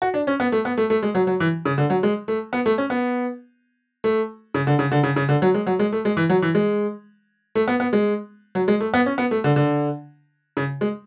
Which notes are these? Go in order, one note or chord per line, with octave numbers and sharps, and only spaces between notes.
F#4
D4
C#4
B3
A3
B3
A3
A3
G#3
F#3
F#3
E3
C#3
D3
F#3
G#3
A3
B3
A3
C#4
B3
A3
C#3
D3
C#3
D3
C#3
C#3
D3
F#3
G#3
F#3
G#3
A3
G#3
E3
F#3
E3
G#3
A3
B3
B3
G#3
F#3
G#3
A3
B3
C#4
B3
A3
D3
D3
C#3
G#3